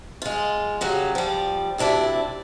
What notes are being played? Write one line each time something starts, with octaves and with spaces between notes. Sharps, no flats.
G#3 F4
C#3 F#3 G3
F3 G3
D2 C3 D4 E4 D5